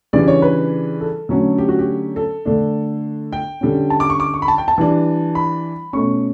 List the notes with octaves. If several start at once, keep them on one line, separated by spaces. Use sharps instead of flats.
C#3 E3 G3 D4 D5
C#5
B4
A4
D3 F#3 A3 C#4
G4
F#4
G4
A4
D3 A3 D4
G5
D3 G3 C#4
A5
D6
C#6
D6
C#6
B5
A5
G5
A5
E3 G3 D4
B5
B2 A3 C#4 C#6